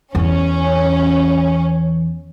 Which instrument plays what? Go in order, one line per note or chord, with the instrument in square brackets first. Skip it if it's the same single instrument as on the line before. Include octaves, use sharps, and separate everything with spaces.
[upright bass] E2 [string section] C#4